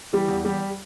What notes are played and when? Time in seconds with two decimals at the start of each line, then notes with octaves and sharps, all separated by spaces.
0.13 E3 G3 G4
0.28 E2
0.45 E2 G3 G4